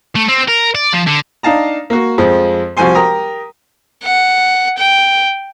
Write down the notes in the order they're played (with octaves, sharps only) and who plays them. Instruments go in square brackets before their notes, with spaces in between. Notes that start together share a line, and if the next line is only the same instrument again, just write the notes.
[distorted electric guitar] A3
C4
A#4
D5
F3
D3
[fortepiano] D4 D#4 F5 A5 A#5
A#3 F#4
F2 F3 G#3
C2 F3 F#4 C5 G#5 C6
G4 A#4 A#5 D#6
[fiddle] F#5
G5